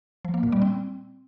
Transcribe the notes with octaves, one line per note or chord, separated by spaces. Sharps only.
F3
A#3
A#2
G3
C4